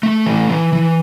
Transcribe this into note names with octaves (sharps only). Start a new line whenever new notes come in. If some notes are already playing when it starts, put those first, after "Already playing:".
A3
E3
E3
E3